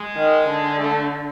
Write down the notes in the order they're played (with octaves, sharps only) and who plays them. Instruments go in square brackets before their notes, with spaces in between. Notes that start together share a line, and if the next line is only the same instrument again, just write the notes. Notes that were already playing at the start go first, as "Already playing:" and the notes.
Already playing: [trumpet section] G#3
[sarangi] D#3
D3
[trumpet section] A3